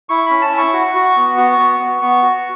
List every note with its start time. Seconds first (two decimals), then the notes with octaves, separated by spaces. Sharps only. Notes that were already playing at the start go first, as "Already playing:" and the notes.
0.09 E4 C#6
0.26 C#4 B5
0.42 A5
0.52 E4
0.58 C#6
0.73 F#4
0.95 F#4
1.16 B3
1.38 F#4
1.58 B3
1.79 B3
2.01 B3 C#6
2.22 F#4